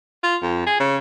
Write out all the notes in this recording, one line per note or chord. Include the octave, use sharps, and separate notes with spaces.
F4
F2
G#4
C#3